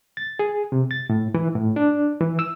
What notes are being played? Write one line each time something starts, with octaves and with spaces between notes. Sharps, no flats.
A6
G#4
C3
A6
A2
E3
A2
D4
E3
E6